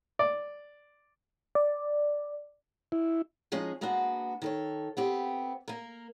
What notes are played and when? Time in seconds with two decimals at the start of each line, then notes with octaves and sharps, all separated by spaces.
0.19 D5
1.55 D5
2.92 E4
3.52 F3 G#3 C#4 D#4 G#4
3.81 G#3 A#3 B3 D4 F#4
4.42 D#3 A4 C#5
4.97 B3 C4 G4
5.68 A#3 A#4